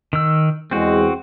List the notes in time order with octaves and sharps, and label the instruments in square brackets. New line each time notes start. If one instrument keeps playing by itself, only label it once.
[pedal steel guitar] D#3 E6
[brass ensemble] E2 G#3 [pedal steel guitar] C4 F#4